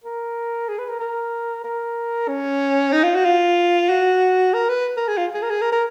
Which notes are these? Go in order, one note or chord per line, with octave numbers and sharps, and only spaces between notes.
A#4
G#4
B4
A#4
A#4
A#4
C#4
D#4
F4
F#4
F4
F#4
A#4
B4
A#4
G#4
F4
G#4
A#4
G#4
A#4
A#4